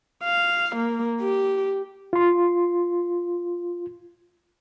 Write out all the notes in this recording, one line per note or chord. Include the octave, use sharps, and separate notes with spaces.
F5
A#3
G4
F4 C6